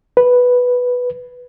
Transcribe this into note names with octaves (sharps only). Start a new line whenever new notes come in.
B4